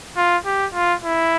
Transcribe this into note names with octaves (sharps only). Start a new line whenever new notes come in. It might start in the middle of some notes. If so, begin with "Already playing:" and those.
F4
G4
F4
E4